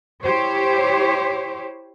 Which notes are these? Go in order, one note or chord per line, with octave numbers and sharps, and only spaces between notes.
E4 G4 C5 C#5